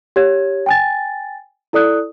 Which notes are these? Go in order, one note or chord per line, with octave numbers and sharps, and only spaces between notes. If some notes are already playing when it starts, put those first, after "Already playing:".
G4 C#5 G#6
G5 G#5 A6
E4 A4 D5 D#6 F#6